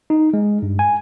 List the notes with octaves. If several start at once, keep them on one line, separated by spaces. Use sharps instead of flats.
D#4
G#3
G2
G#5